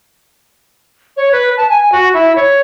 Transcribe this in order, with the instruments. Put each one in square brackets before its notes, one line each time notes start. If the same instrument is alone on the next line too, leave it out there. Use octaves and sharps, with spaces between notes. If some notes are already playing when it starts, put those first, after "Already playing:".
[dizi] C#5
B4
A5
G#5
F#4
E4
C#5